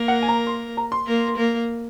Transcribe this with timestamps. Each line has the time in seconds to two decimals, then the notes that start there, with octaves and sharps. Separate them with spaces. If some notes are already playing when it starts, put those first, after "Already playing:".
Already playing: A#3 A#4
0.08 F#5
0.23 G#5
0.28 A#5
0.47 C6
0.77 A#5
0.92 C6
1.07 A#3 A#4
1.37 A#3 A#4